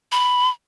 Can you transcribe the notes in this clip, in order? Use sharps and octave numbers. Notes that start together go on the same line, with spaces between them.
B5